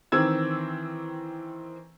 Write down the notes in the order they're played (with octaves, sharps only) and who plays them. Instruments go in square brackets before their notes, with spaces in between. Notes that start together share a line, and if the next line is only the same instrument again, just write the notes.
[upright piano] D#3 E3 C4 E6 G#6